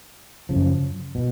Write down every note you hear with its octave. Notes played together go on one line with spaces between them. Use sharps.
F#2 C#3 F3
B2